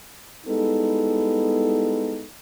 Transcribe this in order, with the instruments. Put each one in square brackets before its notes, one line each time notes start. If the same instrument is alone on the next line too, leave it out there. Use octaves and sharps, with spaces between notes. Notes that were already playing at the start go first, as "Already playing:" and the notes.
[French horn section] G3 G#3 B3 D#4 E4 A4